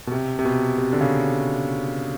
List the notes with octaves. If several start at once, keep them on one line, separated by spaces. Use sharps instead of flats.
B2
C3
C3
B2
C3
D3
C#3